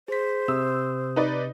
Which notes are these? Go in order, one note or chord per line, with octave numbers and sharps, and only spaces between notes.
G#4 C5 B6
C3 D#6 E6
D#4 B4 D5